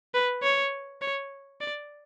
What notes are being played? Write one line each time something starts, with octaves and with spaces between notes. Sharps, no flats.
B4
C#5
C#5
D5